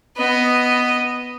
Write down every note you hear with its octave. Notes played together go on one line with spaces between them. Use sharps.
B3 D#5